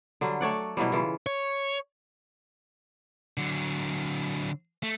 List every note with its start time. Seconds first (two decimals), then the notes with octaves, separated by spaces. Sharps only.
0.21 D3 F#3 G3
0.41 A3 C#5 D5 F#5
0.77 B2 E3 F#3 G3
0.92 C#3 E3 F4
1.26 C#5
3.37 D3 F#3
4.83 A3